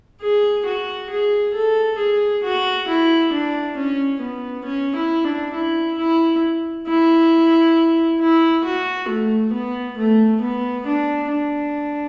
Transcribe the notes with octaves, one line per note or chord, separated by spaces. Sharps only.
G#4
F#4
G#4
A4
G#4
F#4
E4
D4
C#4
B3
C#4
E4
D4
E4
E4
E4
E4
F#4
A3
B3
A3
B3
D4
D4